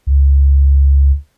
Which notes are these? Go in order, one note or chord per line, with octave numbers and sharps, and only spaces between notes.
C#2